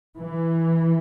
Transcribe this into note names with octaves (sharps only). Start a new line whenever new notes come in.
E3